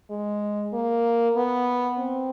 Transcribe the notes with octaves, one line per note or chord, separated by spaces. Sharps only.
G#3
A#3
B3
C4